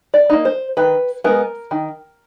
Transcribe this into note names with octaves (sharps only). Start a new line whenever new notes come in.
D5
A#3 D#4
C5
D#3 B4
G#3 B3 A#4
D#3